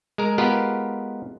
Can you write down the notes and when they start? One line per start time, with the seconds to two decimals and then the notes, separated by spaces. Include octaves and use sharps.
0.18 G#3 A#4
0.38 G#3 B3 F4 G4 A#4 B4